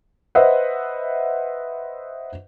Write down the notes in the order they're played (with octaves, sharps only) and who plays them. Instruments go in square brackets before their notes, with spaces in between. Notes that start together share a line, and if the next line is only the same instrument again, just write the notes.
[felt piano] B4 C5 D#5 E5 F#5